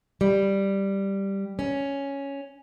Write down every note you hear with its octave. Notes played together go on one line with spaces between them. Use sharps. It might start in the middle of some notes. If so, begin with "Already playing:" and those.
G3
C#4